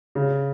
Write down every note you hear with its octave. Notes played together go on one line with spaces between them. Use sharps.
C#3